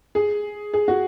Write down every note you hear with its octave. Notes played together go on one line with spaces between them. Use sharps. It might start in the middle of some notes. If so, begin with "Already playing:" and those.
G#4
G#4
F#4